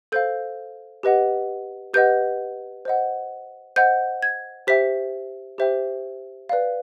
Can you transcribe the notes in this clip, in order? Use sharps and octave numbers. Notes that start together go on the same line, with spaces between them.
A4 C5 F5 G6
G4 B4 D#5 F#5
G4 B4 D#5 F#5 G6
C5 D#5 F#5
C5 D#5 F#5 G6
G#6
G4 C5 E5 G5 B6
G4 C5 E5 G5
B4 D5 F5